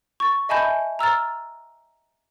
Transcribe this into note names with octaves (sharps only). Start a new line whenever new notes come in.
C#6 A6
D#5 E5 G#5 A5 B5 G6
A#5 E6 F6 A6